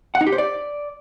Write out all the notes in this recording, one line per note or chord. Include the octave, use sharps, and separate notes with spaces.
F#5
D#4
G4
C5
D5